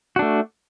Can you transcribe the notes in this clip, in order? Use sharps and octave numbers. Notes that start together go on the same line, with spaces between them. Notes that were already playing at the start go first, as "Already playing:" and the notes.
A3 D4 F#4